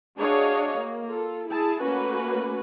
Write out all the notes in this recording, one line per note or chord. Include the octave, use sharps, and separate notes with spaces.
D4 F#4 G#4 C#5 D#5 F5
A#3
F4 A4
E4 G#4 A5
A3 A#3 C#4 F#4 B4